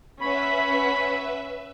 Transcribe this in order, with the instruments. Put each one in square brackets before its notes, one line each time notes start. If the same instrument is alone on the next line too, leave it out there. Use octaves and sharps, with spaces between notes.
[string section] C#4 F#5 B6 [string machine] B4 E5 [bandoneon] B5